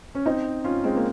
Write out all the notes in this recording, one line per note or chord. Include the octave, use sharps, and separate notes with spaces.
C#4
C4 D#4
C#4 F4
G#3 C4
A#3